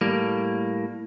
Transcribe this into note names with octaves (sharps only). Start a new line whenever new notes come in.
A2 G3 A#3